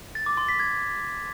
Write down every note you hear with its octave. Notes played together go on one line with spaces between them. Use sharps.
A6
D6
C6
B6
G#6